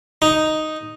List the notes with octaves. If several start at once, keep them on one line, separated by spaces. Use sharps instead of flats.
D#4